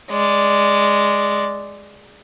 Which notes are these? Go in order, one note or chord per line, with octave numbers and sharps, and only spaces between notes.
G#3 D5